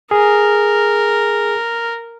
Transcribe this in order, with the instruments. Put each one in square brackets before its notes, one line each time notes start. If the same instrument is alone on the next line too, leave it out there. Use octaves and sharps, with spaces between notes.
[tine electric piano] G#4 [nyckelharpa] A#4